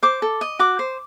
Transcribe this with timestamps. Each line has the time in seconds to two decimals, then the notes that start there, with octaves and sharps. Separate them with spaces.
0.03 C5 D6
0.22 A4
0.41 D#5
0.59 F#4 D6
0.79 C5